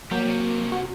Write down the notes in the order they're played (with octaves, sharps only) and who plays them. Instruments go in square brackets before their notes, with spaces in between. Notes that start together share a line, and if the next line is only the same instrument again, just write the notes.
[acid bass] F#3 [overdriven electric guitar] G3 G4 [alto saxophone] A#3
[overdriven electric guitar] C3 C#4
[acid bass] F#4